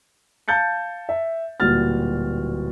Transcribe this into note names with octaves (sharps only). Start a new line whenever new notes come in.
F5 A5 G6 A6 C#7
E5
D1 A#2 G3 F#4 F6 A6